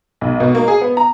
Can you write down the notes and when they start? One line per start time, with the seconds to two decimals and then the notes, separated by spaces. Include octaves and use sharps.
0.21 B1
0.40 B2
0.55 A#3
0.68 G#4
0.81 B3
0.97 A#5